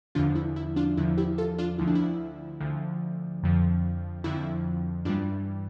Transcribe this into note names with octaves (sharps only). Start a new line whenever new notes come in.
E2 D3 F3 D4 F4
E4
E4
D4 F4
E2 D3 F3 E4
E4 G4
F4 A4
D4 F4
D2 D3 F3 E4
D4
E4
D2 D3 F3
F2 D3 F3
F2 D3 F3 E4
G2 E3 G3 D4 F4